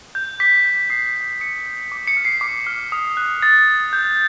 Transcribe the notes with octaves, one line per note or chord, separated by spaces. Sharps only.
G6
D6 B6
G6
D#6 C7
G6
D#6 C#7
G6
D6
C#7
F6
C7
D6
F6
D#6
F#6
D#6 A6
F#6
D6 G6